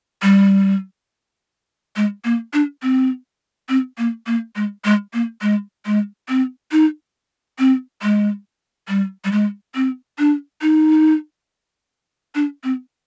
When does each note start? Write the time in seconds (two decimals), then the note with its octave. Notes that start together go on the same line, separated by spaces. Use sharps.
0.22 G3
1.96 G#3
2.25 A#3
2.53 D4
2.82 C4
3.69 C4
3.98 A#3
4.26 A#3
4.56 G#3
4.85 G#3
5.14 A#3
5.42 G#3
5.86 G#3
6.29 C4
6.72 D#4
7.59 C4
8.02 G#3
8.88 G3
9.24 G3
9.32 G#3
9.75 C4
10.19 D4
10.62 D#4
12.35 D4
12.64 C4